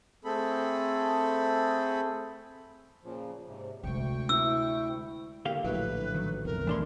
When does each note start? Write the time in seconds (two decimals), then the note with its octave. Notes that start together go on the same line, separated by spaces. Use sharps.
0.25 A3 C4 G#4 A4 B5
3.04 A#2 C#3 F3
3.47 G#2 C3
3.84 D2 C3 G#3 G5 C#6
4.29 E4 E6
5.45 D3 A#3 G4 F5
5.64 A#1 A2 F#3 E4 B4
6.14 D#3 F#3
6.45 B1 F2 A2 A#4
6.67 E3 A3 C#4 D4 C6